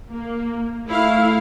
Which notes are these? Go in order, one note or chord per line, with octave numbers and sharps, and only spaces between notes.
A#3
A3 E4 F5